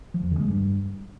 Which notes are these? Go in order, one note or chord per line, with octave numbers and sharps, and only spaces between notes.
F3
E2
D3
G#3
G2